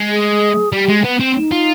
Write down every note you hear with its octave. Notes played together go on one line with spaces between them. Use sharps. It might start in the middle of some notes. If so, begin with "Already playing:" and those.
Already playing: G#3
G#4
G3 G4
G#3
B3
C4
D#4
F4